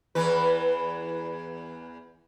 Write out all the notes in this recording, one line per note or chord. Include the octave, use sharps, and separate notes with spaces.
E2 E3 B4